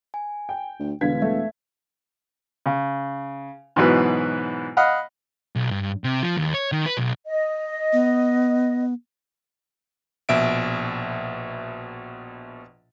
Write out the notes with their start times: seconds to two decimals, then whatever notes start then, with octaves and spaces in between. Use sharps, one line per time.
0.14 G#5
0.49 G5
0.80 D2
1.01 E1 D3 B4 F5 G#6 B6
1.22 A3 E5
2.66 C#3
3.76 G#2 B2 E3 F#3 B4
4.77 D#5 F5 F#5 B5
5.56 B1
5.71 G2
6.04 C3
6.23 F3
6.37 D#2
6.54 C#5
6.72 D#3
6.86 B4
6.97 B1
7.27 D#5
7.93 B3
10.29 A#1 B2 E5 D7